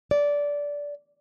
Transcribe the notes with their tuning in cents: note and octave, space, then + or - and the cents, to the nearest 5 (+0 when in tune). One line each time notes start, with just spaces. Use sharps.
D5 -15